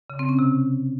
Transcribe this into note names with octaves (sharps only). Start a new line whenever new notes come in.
C#3
C4
C#4
C3